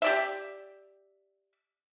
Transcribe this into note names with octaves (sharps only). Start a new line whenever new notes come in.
G4 D5 E5